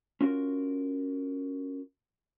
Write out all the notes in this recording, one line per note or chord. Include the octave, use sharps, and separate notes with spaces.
C#4 F4 F#4 A#4